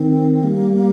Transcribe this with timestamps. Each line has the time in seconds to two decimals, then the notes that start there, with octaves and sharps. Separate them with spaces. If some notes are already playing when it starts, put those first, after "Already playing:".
Already playing: D#3 C4
0.43 G3 A#3